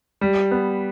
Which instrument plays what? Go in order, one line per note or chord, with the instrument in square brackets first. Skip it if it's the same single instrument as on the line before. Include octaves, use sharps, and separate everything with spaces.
[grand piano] G3
B3